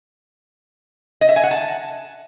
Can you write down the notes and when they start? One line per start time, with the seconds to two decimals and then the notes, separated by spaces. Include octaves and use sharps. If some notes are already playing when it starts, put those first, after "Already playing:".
1.21 D#5
1.29 E5
1.36 G#5
1.44 F#5
1.51 A5